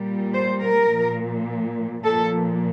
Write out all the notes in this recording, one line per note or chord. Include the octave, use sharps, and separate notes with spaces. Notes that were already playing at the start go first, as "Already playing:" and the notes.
Already playing: A#2 G3
C5
A#4
A#2 F3
A#2 F3 A4